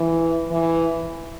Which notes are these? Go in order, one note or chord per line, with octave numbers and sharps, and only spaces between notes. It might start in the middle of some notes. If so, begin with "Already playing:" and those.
Already playing: E3
E3